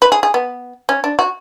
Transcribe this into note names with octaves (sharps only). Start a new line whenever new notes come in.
B4
G#4
G#4
B3
C#4
D4
F#4